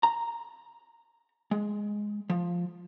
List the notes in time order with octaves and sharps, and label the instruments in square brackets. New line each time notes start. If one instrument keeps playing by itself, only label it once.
[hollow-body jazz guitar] A#5
G#3
F3